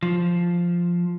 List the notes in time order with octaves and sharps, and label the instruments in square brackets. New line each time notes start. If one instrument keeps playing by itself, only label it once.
[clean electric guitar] F3